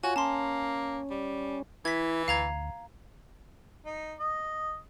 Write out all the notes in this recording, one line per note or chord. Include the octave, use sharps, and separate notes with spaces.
F4 F#4 C#5 F#5 G#5
A#3 C#4 A5 C6
G3
E3 E4 G#6 B6
D2 F5 A#5 G#6
D#4
D#5